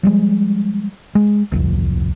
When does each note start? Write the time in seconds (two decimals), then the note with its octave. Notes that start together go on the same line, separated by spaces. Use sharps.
0.03 F3 G3 G#3
1.15 G#3
1.52 D1 C2 F2